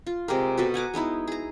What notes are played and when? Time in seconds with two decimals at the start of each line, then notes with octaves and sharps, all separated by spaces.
0.07 F4
0.28 C3 G#3 G4 A#4
0.58 B2 F#4 A4 B4
0.74 F#5 G#5 A#5 D6
0.94 G#3 B3 D#4 E4
1.28 G#4 A#5